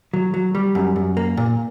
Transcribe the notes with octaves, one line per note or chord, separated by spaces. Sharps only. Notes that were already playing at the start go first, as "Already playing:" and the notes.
F#3
F#3
G3
F#2
F#2
A#3
A#2